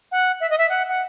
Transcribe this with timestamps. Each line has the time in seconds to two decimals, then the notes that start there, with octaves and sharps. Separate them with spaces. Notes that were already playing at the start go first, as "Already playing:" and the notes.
0.12 F#5
0.40 E5
0.50 D#5
0.58 E5
0.69 F#5
0.89 F#5